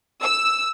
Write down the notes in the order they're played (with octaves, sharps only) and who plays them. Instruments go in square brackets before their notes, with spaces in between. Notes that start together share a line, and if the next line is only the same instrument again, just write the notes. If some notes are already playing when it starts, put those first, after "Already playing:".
[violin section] E6